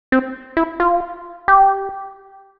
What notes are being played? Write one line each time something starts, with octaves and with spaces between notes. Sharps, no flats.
C4
E4
F4
G4